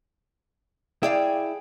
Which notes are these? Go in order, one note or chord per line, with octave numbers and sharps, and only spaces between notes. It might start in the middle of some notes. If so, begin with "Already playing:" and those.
E4 G#4 D5 F5 G5